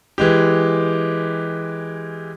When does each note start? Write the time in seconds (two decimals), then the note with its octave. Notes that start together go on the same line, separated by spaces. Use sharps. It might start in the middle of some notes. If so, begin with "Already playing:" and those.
0.18 E3 G#3 G4